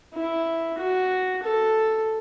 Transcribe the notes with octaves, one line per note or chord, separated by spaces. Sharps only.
E4
F#4
A4